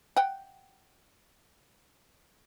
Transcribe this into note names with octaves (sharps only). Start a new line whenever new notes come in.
F#5 G5